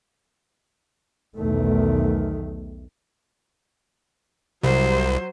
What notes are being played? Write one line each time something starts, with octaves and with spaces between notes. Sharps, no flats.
B1 E2 D#3 A3
C2 F#3 C5